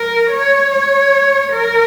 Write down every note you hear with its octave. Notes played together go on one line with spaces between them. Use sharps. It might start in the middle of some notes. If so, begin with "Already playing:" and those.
Already playing: A#4
C#5
C#5
A#4